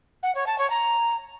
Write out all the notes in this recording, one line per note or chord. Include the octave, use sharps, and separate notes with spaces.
F#5
C#5
A5
C#5
A#5